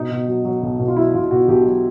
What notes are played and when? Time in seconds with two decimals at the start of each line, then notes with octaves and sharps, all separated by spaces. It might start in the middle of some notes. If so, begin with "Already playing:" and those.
Already playing: B2 D#4
0.11 B2
0.28 F#3
0.45 F#3
0.63 B1
0.79 B2
0.88 F4
0.96 F#3 E4
1.14 B1 F4
1.31 B2 F#4
1.48 B1 G4
1.65 F#3